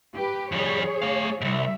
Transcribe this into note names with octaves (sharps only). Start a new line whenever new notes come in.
G4 B4
F2 G3 G#4 C#5
A3 F5
C2 G#2 G3 E5